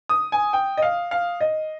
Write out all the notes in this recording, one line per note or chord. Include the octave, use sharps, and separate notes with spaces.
D#6
G#5
G5
D#5
F5
F5
D#5